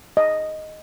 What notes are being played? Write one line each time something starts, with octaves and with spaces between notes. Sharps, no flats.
D#5